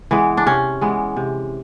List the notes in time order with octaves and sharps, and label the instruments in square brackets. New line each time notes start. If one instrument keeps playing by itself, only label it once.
[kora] E3 G#3 B3
D4
C3 C#4
E3 G#3 B3
C3